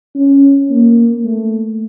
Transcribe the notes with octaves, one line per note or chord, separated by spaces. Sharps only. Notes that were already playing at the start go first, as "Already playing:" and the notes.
C#4
A#3
A3